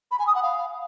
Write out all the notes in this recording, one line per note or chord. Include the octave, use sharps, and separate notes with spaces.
B5
G#5
D#6
F#5
F5